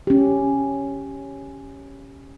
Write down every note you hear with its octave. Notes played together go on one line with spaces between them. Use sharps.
C#4 G4